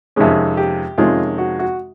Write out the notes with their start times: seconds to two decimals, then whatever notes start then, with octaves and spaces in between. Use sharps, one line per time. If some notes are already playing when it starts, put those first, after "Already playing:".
0.16 F2 C3 D#3 G#3 C#4 G#4
0.57 G4
0.98 F2 C3 D#3 G#3 C#4 F4
1.38 F#4
1.59 F#4